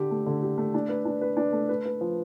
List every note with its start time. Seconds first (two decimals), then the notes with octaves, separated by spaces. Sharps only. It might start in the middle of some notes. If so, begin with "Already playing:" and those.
Already playing: D3 G4
0.11 A3
0.26 D3
0.42 G4
0.58 A3
0.74 D4
0.89 B4
1.05 D4
1.21 B4
1.37 D4
1.53 A3
1.69 B4
1.86 B4
2.01 F3